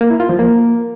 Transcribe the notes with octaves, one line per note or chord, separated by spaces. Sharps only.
A#3
E4
F4
F3
A#3